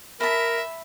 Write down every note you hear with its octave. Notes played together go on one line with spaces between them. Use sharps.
A#4 E5 A5 B5